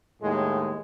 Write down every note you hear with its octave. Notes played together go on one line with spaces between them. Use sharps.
D#2 A2 G#3